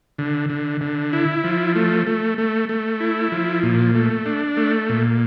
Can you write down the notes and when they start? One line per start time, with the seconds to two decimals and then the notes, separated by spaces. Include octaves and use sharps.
0.18 D3
0.50 D3
0.81 D3
1.13 E4
1.44 F3
1.75 A3
2.07 A3
2.38 A3
2.69 A3
3.00 E4
3.32 F3
3.63 A#2
3.95 A3
4.26 D4
4.57 A3
4.89 A#2